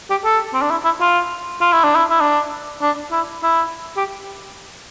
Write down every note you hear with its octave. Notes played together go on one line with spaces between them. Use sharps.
G4
A4
C4
D4
E4
E4
F4
F4
E4
D4
E4
E4
D4
D4
E4
E4
G4